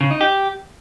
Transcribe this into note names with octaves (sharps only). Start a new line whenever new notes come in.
C#3
D#4
G4